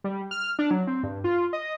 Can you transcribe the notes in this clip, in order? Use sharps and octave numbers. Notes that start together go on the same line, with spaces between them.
G3
F6
D4
F#3
C4
G2
F4
D#5